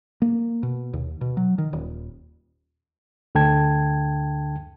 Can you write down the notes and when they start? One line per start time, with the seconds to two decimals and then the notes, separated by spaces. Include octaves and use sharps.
0.22 A#3
0.63 B2
0.93 D#2
1.21 B2
1.37 F#3
1.58 D#3
1.73 D#1
3.35 D2 D3 G5 A5 G#6